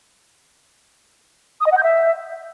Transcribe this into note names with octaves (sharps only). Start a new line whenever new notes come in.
D#6
D#5
F#5
G6
E5